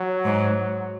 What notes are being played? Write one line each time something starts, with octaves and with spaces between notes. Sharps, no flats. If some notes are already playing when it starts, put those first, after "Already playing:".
Already playing: F#3
G#2